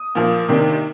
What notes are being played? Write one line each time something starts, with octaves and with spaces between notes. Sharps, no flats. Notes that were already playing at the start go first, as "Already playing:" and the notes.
Already playing: D#6
A#2 F3 A#3
C3 D#3 A#3 D4